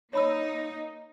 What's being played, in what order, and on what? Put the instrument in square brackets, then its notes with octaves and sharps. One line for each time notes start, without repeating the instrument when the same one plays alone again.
[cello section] A#3 D#4 [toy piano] C#5 B5 E6